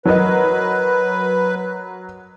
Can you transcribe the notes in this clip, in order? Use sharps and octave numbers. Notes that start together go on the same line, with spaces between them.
F#3 A#4 B4 D#5